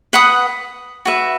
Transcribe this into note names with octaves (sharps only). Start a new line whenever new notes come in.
B4 F#5 B5 D#6
F#4 B4 E5